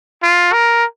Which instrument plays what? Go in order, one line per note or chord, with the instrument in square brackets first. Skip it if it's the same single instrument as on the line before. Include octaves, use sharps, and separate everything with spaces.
[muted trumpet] F4
A#4